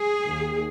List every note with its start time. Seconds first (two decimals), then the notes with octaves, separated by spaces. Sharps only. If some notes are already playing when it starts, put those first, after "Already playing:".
Already playing: G#4
0.25 D#2 D#3